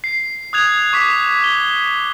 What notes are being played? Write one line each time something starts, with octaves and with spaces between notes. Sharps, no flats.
C7
D#6 F#6 G#6 F7
C#6 D6 B6
G7